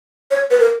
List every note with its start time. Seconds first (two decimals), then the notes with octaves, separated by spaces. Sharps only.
0.31 C#5
0.51 B4
0.60 A#4